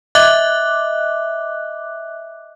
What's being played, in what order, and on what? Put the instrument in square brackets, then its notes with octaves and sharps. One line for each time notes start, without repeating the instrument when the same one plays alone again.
[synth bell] D#5 E5 D6 F#6